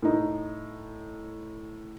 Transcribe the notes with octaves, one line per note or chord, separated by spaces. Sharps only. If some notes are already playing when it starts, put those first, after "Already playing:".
A2 D#4